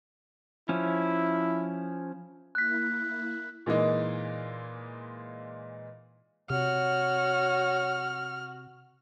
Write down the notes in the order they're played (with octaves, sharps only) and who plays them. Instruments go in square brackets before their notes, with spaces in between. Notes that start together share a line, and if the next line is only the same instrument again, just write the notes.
[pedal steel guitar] F3 C#4 [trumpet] E4
[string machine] A#3 E4 [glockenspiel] F#6 B6
[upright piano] A#2 E3 G#3 A#3 D#4
[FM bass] C3 [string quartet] F#4 [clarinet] C#5 [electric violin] F6